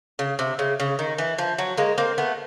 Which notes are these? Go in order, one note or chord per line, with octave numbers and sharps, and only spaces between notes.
C#3
C3
C#3
C#3
D#3
E3
F3
F#3
G#3 A#3
A#3 C4
A3 B3